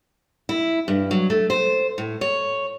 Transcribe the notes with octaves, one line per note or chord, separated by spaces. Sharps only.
E4
G2
F#3
A3
C5
A2
C#5